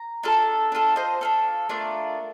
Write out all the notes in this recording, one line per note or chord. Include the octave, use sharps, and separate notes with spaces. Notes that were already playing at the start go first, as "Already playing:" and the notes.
Already playing: A#5
D4 F4 A4
D4 F4 A4
C5 D#5
D4 F4 A4
A3 D4 F4 A#4 D5